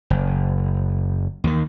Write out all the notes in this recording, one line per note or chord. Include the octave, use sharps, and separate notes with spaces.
F#1
D#2 D#3